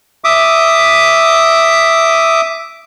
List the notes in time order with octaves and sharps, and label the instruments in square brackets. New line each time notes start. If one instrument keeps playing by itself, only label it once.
[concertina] E5 D6 D#6